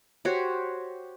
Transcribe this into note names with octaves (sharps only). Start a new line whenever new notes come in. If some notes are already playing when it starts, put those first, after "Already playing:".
F#4 G4 C5 C#5